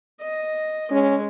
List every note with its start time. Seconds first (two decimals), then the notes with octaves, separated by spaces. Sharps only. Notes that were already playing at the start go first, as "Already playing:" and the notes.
0.22 D#5
0.91 G#3 C#4